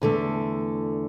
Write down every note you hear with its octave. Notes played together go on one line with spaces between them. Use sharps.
E2 D3 A3